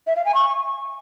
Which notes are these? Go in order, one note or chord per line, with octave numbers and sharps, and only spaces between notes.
E5
F5
G#5
C#6